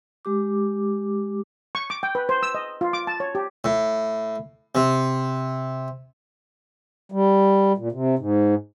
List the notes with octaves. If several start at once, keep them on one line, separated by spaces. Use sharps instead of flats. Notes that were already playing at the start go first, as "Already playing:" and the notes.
G#3 G4 D6
C#6
D6
G5
B4
C5
E6
D#5
F4
D6
A5
C#5
G4
A2
C3
G3
A#2
C3
G#2